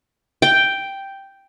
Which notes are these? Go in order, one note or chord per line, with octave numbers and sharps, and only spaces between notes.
G5